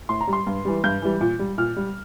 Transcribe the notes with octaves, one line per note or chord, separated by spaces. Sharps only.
A2 C6
A#5
G3
C6
G2
E3 G3
G2 G6
E3 G3
A#2
G3
A#2 F6
G3